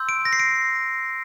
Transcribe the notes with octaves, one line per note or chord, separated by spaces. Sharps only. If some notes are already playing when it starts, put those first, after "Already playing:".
Already playing: C6 E6 G6
D7
A#6
C7
D7